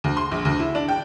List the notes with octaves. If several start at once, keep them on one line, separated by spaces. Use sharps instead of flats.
D2
C6
A#1
D2
E4
D4
G5